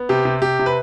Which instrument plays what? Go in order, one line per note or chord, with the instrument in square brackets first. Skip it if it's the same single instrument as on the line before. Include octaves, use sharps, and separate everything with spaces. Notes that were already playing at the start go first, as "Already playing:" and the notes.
Already playing: [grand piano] B3
C3 G4
C3
C3 G4
C3
B4